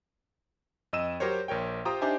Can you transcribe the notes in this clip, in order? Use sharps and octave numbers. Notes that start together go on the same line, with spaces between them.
F2 D#5 E6 D#7 E7
F#3 G4 A#4 C5 C#5
A#1 A#4 C#5 G5
F4 G4 C5 G5 A#5 D#6
D4 D#4 G4 C5 E5 G#5